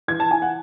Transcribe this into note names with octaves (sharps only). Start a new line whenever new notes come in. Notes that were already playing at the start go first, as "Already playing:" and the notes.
E3 G#6
A5
E4 G#5
F#5